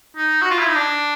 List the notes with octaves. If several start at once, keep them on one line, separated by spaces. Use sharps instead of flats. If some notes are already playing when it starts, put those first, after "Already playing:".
D#4
F#4
F4
E4
D#4
D4